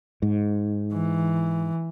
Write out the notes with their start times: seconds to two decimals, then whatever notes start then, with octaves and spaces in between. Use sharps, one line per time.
0.22 G#2
0.92 E3